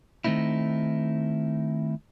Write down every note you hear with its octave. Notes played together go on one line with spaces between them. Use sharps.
D#3 A3 C4 D#4 E4